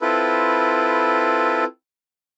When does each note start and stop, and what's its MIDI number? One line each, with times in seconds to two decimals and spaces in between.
0.01 1.64 60
0.01 1.64 64
0.01 1.64 65
0.01 1.64 69
0.01 1.64 71